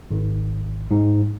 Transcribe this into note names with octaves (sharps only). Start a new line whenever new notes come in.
G#1
G#2